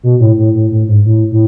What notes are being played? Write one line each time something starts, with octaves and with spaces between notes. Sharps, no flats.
B2
A2
A2
A2
A2
G#2
A2
A2